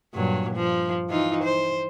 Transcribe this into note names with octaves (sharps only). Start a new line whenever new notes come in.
G2 A#2 F#3
F3
E3 D#4 F4
C5